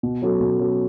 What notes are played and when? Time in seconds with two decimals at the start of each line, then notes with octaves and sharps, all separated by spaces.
0.03 B2
0.22 F#3 C#4 F#4 A4
0.40 B2
0.59 F#3 C#4 F#4 A4